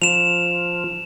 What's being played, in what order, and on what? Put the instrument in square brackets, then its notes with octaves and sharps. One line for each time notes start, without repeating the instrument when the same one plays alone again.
[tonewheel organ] F3 [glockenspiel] E7 F7